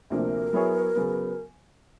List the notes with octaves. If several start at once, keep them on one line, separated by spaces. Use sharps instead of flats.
D2 C3 F3 A#3 D4 A#4
F#3 B3 E4 G#4 C#5
C#3 F#3 B3